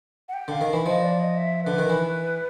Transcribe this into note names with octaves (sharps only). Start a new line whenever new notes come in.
F#5
G5
D3 F5
D#3
E3
F3 D#5
D5
D#5
E5
D3 B4
D#3
E3